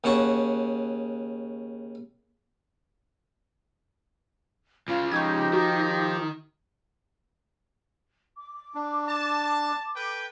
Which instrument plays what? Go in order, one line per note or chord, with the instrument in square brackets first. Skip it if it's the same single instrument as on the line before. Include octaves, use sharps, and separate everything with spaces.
[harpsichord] D#2 C#3 F#5 A5 C#6
[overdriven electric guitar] C#2 C#3 [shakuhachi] F4
[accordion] F3 G4 [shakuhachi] D#4 [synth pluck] C#6 D#6 G#6
[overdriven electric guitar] D#3 [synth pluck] F#4
[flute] D6
[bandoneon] D4
[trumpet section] A5
A4 B4 G5